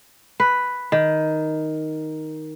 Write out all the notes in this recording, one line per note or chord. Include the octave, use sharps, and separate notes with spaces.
B4
D#3